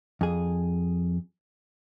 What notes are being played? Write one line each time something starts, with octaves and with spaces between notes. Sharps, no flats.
F2 G#4